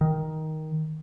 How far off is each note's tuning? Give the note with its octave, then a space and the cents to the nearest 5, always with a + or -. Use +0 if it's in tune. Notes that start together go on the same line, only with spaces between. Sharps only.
D#3 +10